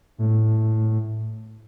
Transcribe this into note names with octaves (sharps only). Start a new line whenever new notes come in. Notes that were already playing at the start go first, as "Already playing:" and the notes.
A2